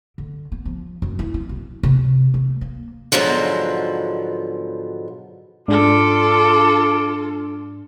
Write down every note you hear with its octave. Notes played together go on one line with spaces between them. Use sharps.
D3
B3
F3
F#2
E4
C4
B1
C3
A3
A#3
G#2 B2 D3 F3 F#3
G#2 D4 F4 A4 D6